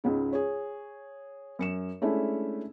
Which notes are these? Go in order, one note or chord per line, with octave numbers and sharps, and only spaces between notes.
C#2 G#2 C#3
G#4 C#5
F#2 C#7 E7
G#3 A3 C#4 D4 E4